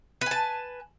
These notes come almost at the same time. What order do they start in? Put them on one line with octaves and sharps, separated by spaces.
B4 G#5 A5